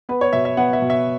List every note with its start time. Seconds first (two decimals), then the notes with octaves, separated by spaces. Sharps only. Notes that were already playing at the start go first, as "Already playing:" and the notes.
0.09 B3 B4
0.21 C#5
0.33 B2 E5
0.45 E5
0.57 B3 F#5
0.73 E5
0.82 B2
0.90 E5